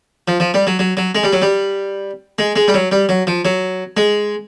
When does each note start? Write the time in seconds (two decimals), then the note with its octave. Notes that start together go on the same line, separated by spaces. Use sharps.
0.28 F3
0.40 F3
0.54 G3
0.67 F#3
0.79 F#3
0.97 F#3
1.15 G#3
1.23 G3
1.33 F#3
1.42 G3
2.39 G#3
2.56 G#3
2.68 G3
2.74 F#3
2.92 G3
3.09 F#3
3.27 F3
3.45 F#3
3.97 G#3